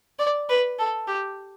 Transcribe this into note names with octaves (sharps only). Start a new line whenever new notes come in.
D5
B4
A4
G4